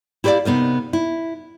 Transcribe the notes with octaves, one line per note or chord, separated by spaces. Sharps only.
E4 G4 B4 C#5 D5 F5
C3 B3 D#4 A#4
E4